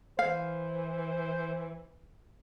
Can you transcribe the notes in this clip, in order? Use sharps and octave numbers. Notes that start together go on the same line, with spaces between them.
E3 C5 F5